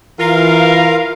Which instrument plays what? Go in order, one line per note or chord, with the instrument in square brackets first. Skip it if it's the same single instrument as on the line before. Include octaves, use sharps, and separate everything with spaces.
[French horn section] E3 [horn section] F4 A#4 [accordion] F5